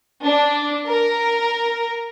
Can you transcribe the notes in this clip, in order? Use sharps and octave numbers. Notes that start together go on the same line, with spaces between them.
D4
A#4